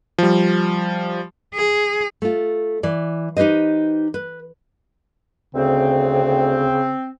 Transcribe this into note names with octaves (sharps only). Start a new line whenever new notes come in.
F3 G3
G#4
A3 F4
E3 D5
D#4 G4 B4 C5 D#5
B4
D2 C#3 C4